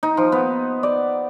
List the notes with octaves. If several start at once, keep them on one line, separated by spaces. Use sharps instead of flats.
D#4
F3
B3
D5